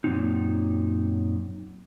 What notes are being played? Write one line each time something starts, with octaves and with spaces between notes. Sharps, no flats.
F#2 A#2 D3 F#3 C4 D#4